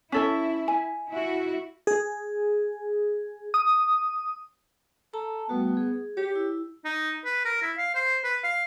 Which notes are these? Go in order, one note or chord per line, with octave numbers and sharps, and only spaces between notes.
C#4 E4 A4 E5
G#5
E4 F#4
G#4
D#6
A4 A5 A#5
G3 A3 B3 F#4
G#4
G4 C#5
E4
D#4
B4
A#4
E4
F5
C5
B4
F5